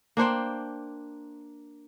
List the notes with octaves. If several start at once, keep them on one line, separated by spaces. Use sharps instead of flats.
A#3 D4 C5 G5